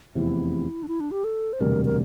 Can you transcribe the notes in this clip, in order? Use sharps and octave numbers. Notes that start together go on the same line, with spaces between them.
F1 E2 C3 E4
D4
E4
D4
G4
A4
C5
E1 D2 C3 G3 A#4
A#4